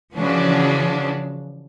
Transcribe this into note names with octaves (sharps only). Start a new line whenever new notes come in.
C#3 E3 F3 D4 F#4